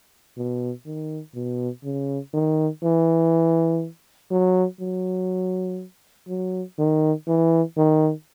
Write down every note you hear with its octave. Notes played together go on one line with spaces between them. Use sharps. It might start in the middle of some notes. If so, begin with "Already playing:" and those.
B2
D#3
B2
C#3
D#3
E3
F#3
F#3
F#3
D#3
E3
D#3